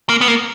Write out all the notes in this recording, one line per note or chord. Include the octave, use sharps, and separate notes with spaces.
A#3
B3
A#3